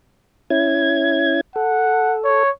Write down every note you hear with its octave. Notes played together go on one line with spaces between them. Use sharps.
C#4 E4 G#6
A4 F#5
C#5